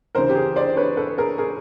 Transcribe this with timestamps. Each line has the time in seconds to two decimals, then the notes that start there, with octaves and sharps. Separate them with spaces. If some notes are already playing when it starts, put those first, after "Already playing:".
0.15 D2 C#3 E3 A#4 C5
0.29 G4
0.35 G#4
0.56 C5 D5
0.77 B4 C#5
0.97 A4 B4
1.18 G#4 A#4
1.38 G#4 A#4